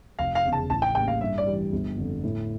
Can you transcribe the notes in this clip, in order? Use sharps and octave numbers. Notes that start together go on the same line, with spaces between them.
F1 F5
F5
E2 C#3
A5
A1 A5
G5
A2 G3 A#3 C#4 G5
F5
G2 E5
D5
E3 G3
G1
F2 D3
A2